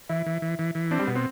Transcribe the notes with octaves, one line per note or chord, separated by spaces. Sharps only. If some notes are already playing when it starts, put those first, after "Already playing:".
E3 E4
E3
E3
E3
E3
C4 D4
G3
B2 B3
C4